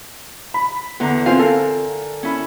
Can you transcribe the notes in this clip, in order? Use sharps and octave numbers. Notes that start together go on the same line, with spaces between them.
B5
E2 D3 A#5
C4 F4 F5 G#5
A4 A#4
C#4 E4